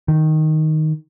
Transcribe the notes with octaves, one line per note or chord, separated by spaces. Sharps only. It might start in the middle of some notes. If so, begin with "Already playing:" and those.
D#3